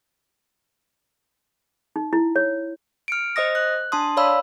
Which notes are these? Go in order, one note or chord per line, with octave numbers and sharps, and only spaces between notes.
D#4
E4
C#5
F6 C#7 D7
C5 D#5 D#6 A#6
F#6
D4 A5 C6 D#6
C#5 D5 F5 B5 E6